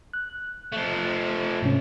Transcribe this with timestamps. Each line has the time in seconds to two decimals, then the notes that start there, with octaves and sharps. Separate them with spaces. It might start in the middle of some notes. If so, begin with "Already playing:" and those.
0.13 F#6
0.72 F3 A3
1.62 G#2 C3 C#4